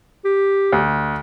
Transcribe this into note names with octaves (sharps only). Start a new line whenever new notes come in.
G4
D2